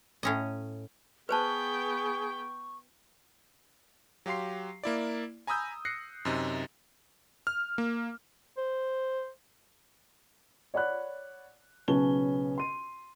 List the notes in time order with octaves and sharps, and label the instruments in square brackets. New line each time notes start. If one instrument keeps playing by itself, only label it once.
[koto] A2 C#4 D#5
[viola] B3 G5 [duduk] G#4 [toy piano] B4 C5 A5 [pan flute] C#6
[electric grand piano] F#3 G4 F5 C6 C7
A#3 E4 D5
G#5 A#5 B5 D#6 E6 G6
F#6 A#6 C7 C#7
F#2 C3 D#4
F6
A#3
[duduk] C5
[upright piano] C#5 D5 F#5 B5 F#6
B1 C#3 B3 C#4 A5 G7
C6 D#7